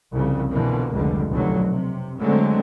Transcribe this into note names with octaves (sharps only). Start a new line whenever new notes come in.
C2 F2 C#3
B2 D3 E3 F3 A#3
F1 C#2 D3 G3
F1 B1 D3 F#3
C3
D3 F#3 G#3 A3 C4